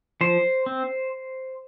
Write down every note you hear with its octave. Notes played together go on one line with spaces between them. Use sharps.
F3 C5
C4